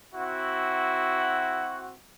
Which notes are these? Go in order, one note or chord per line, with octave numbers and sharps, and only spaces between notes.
C4 E4 F#4